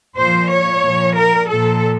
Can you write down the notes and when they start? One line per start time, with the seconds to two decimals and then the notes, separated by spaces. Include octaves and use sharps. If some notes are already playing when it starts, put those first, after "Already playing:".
0.17 A#2 F3 C5
0.49 C#5
0.83 A#2 F3
1.15 A#4
1.48 A#2 F3 A4